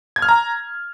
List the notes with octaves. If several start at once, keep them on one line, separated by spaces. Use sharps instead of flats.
G#6
F6
A#5